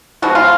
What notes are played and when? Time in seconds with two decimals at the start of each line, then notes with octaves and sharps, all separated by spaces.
0.22 F3 G#3 B3 F#4
0.35 F4